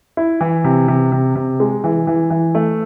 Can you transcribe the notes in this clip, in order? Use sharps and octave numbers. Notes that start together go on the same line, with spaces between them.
E4
E3
C3
C3
C3
C3
G#3
E3
E3
E3
A3